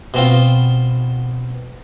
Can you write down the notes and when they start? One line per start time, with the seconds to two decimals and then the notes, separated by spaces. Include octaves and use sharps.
0.14 B2 C4 F4